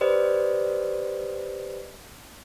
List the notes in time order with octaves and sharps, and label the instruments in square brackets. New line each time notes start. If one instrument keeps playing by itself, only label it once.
[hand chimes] G4 B4 C5 D5 D#5